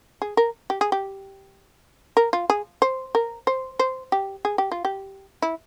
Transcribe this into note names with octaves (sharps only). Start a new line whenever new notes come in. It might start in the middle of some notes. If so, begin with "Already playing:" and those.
G#4
A#4
G4
G#4
G4
A#4
F4
G#4
C5
A#4
C5
C5
G4
G#4
G4
F4
G4
E4